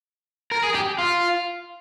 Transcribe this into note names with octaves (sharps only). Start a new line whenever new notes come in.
A#4
G#4
G4
F4